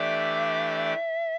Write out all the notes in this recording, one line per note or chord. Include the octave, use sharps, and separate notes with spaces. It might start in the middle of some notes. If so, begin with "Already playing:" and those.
Already playing: E3 A3 D4 G4 D5 E5